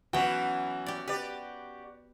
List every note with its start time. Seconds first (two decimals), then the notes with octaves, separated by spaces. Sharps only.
0.13 E3 F#3 B3 C#4 F#4 G5
0.86 G4 D5
1.08 G4 B4 D5